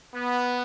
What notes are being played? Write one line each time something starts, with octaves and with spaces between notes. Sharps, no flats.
B3